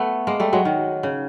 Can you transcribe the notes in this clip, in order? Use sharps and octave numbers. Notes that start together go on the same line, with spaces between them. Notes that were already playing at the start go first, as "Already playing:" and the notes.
Already playing: A3 B3
G#3 A#3
G3 A3
F#3 G#3
D#3
C#3